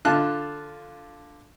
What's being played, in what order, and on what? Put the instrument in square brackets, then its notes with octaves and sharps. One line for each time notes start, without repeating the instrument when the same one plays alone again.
[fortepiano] D3 F4 A5 F#6